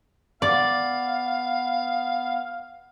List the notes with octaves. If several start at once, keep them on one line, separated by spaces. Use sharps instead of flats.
B3 D5 F5